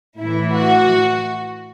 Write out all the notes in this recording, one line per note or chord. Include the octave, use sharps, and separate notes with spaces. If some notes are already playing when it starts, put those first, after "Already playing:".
A2 E3 E4
F#4